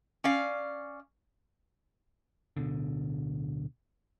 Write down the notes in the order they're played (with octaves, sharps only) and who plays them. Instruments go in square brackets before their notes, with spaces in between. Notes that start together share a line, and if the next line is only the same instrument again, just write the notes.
[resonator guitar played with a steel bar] C#4 D5 F5
[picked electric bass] D1 G#1 B2 D3